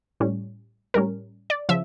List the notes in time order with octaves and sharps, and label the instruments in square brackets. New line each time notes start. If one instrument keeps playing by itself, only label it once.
[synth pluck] A2 G3 C#4
A2 G3 C#4 A#4
D5
C#3 F3 E5